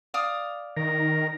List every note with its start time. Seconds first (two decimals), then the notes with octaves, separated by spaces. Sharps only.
0.14 D5 F5 D#6
0.77 D#3 A#4